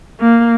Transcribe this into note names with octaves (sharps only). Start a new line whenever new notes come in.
A#3